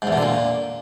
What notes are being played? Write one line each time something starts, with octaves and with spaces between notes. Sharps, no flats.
G#2
E2
B2
D3
A#2